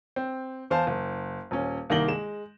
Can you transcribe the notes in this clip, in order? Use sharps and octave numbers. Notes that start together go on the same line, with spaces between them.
C4
E2 C5 F5 A5
F#1
D#1 C#4
C2 D#3 A#3 A#6 F#7 G7
G#3 E7